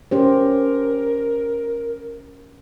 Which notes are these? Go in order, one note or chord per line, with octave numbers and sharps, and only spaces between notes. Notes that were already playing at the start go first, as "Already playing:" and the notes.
C#4 G4 A#4 C5